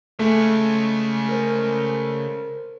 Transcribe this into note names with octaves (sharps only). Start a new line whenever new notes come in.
C#3 G#3 A3
A#4 C5